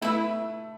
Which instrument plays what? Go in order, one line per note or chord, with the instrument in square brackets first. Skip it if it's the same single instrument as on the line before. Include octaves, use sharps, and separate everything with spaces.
[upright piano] A3 [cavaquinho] E4 B4 E5